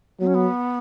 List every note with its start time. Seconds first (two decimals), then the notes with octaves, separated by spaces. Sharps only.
0.20 F#3 B3
0.27 C#4
0.34 B3